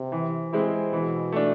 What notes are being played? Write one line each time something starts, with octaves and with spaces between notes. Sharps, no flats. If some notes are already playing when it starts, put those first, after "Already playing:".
Already playing: C3
E3
G#3 C4 E4
B2 E3
A3 D4